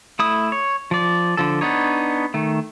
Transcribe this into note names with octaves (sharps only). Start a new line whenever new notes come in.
A3 E4 D#6
C#5
F3 D5
D3 F3 A4
B3 D4 D#4 C#5
D#3 A3